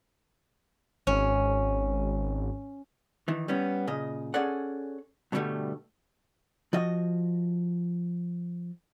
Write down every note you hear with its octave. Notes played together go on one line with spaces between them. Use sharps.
G#1 C#4
D#3 E3
G3 B3 C#4
A#2 C#3 D#5
C#4 G#4 A4 D5 F#5
G2 B2 D3 D#3 G3 A3
F3 F#4 D#5